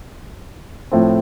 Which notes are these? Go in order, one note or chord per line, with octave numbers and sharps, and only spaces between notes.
A2 F3 A3 C4